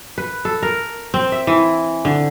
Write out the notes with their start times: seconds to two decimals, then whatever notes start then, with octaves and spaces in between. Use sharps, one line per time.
0.18 B4
0.45 A4
0.62 A#4
1.14 C4
1.32 E5
1.47 E3
2.05 D3